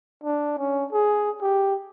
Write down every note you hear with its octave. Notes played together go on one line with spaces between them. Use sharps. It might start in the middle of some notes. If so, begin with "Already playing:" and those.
D4
C#4
G#4
G4